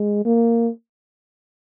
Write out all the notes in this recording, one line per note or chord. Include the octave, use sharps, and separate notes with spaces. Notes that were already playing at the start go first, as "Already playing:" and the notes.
Already playing: G#3
A#3